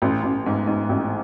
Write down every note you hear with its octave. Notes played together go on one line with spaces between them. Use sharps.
A1
A1
G#2
G#2
A1